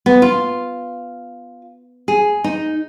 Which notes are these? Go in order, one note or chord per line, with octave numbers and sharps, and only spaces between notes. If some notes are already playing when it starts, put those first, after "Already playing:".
B3
F4
G#4
D#4